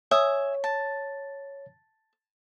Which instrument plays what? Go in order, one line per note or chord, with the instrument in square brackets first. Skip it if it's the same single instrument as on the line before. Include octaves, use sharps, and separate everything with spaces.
[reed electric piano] C#5 [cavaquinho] E5 G#5 D#6
[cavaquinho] A5